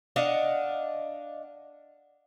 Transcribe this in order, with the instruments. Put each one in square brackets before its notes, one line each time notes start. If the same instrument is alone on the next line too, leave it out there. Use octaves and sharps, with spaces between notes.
[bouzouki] D4 D#5 F5 F#5